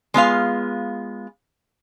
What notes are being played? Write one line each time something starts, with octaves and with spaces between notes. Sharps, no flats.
G#3 B3 F4 F5